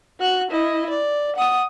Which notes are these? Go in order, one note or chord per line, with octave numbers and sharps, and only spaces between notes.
F#4 F#6
E4 D#5
D5
F#5 D#6